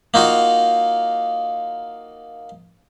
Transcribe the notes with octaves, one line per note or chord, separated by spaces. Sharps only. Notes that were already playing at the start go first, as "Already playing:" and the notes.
A#3 D#4 F4 F#4